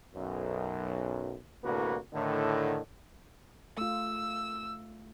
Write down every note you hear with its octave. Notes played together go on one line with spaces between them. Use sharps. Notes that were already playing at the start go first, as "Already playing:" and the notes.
B1 F#2
C2 A2 D3 A#3 F#4 B4
A2 D3 D#3
A3 F4 E6